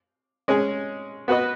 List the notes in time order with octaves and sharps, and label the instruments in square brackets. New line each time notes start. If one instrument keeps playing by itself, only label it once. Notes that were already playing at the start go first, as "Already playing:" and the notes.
[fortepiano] G#3 C#4 G#4
B3 F#4 B4 D#5